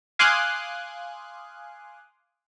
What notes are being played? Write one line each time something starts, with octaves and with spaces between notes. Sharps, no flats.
F5 G#5 C6 D6 D#6 F#6